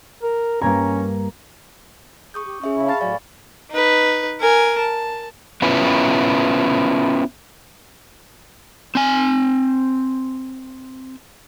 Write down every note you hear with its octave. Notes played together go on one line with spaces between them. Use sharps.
A#4
G2 A#3 C#4 A#5 G#6
G#4 C#6 D#6 G6
G4
C#4 G#4 E5 C#6
C#3 E4
F5 A5 B5 C#6 A6
A2 F#3 D5 F5 G#5
D#4 B4
A#4 G#5
A5
B3 C#4 E4 F4 B4
C4 G#5